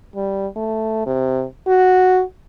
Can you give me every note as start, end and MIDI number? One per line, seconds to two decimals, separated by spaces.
0.16 0.47 55
0.56 1.02 57
1.06 1.45 48
1.68 2.22 66